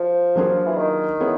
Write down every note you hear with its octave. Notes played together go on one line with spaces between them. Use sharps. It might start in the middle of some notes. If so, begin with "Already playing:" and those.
Already playing: F3
F#3 A#3 D4 F4 G#4
E3
D#3
B3 E4 G#4 C#5